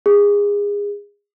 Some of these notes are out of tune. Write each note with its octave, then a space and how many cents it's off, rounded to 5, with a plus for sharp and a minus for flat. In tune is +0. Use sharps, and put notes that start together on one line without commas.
G#4 -25